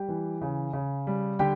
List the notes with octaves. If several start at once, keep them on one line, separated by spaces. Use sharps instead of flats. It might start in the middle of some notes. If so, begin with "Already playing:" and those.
Already playing: G3 G4 G5
E3
C#3
C#3
G3
D3 G4 G5